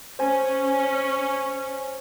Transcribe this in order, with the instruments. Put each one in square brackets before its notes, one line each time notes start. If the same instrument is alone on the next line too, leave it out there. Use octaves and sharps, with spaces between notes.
[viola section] C#4 [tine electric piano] C5 G#5